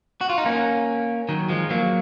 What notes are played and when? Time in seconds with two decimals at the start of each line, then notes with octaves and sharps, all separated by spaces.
0.21 F#4
0.29 F4
0.38 D#4
0.46 A#3 C#4
1.29 D#3 F#3
1.49 F3 G#3
1.70 F#3 A#3